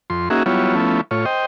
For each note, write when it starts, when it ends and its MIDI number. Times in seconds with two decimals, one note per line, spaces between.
0.10 0.29 41
0.10 0.29 84
0.30 0.43 58
0.30 0.43 61
0.30 0.43 63
0.30 0.43 66
0.30 0.43 68
0.30 0.43 76
0.46 0.75 54
0.46 0.75 55
0.46 0.75 59
0.46 0.75 64
0.46 0.75 65
0.46 0.75 73
0.75 1.01 53
0.75 1.01 57
0.75 1.01 59
0.75 1.01 61
0.75 1.01 64
1.11 1.25 45
1.11 1.25 65
1.11 1.25 73
1.25 1.46 72
1.25 1.46 75
1.25 1.46 79